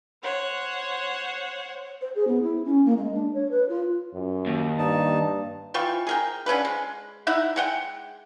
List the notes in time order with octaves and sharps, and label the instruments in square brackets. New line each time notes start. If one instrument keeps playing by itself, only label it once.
[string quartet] C5 C#5 F#5
[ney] C5
G#4
B3
E4
C#4
A#3
G#3
D4
C#5
B4
F4
[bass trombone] F#2
[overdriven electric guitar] D#2
[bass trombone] G2 [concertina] D#4 A5
[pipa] E3 F4 G5 C#6
G#4 A#4 G5
D3 C#4 A4 B4
G#3
D#4 E4 E5 F#5
G#3 F#5 G5